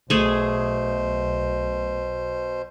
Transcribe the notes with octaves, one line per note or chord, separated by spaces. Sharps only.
B1 B2 A3 G#4 C5